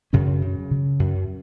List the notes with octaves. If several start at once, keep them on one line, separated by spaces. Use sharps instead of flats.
F#2 C#3 C#4
C#3
C#3
F#2